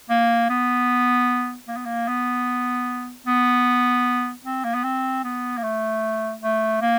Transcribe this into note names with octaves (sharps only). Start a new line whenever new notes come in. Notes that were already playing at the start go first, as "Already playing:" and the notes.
A#3
B3
A#3
B3
A#3
B3
B3
C4
A#3
B3
C4
B3
A#3
A3
A3
A#3